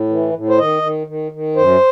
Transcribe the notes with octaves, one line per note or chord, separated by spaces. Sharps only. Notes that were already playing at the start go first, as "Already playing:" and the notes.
Already playing: A2
E3
A2
C5
D#3 D#5
D#3
D#3
D#3
F#2 C5